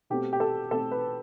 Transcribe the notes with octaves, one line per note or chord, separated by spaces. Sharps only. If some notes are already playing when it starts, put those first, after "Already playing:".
B2 A3 C4 G4
G4
A4
B2 A3 C4 A4
B4